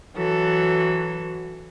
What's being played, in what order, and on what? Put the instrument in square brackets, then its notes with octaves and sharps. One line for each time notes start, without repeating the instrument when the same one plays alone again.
[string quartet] E3 F#3 A4